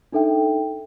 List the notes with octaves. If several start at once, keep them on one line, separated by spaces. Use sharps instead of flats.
D4 D#4 A4 E5 G5